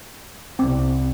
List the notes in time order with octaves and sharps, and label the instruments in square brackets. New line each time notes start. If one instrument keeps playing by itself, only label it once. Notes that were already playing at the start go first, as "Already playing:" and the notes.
[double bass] C2 [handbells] C4 D6